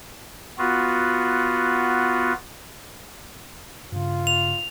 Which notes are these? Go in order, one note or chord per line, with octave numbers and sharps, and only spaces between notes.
B3 F4 F#4
G2 C#3 F4
F7